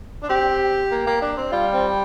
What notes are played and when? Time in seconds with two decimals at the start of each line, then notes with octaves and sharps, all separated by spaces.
0.23 D4
0.29 C4 G4
0.91 A#3
1.07 A#3
1.22 D4
1.37 C4
1.52 G3 F4
1.73 C4